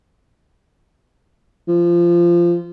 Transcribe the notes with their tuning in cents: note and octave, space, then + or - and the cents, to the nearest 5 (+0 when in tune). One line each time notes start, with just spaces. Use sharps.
F3 -20